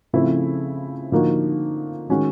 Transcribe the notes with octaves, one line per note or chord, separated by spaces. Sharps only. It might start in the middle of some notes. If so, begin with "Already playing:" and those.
C#3 F3 A3 C4 E4
D3 F3 A#3 D#4 F#4
D#3 G#3 C#4 F#4